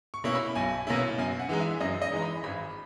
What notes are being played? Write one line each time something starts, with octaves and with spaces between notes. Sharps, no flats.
C#6
B2 A#3 C#4 E4
B5
B1 G#5
B2 A#3 C#4 E4
F#2 G#5
F#5
E3 G#3 D#4
E5
F#2 D#5
D#5
E3 G#3 D#4 A#5
B5
G#1 B5